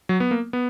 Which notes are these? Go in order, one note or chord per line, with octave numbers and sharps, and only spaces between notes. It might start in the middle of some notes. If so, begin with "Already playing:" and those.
F#3
B3
A#3
B3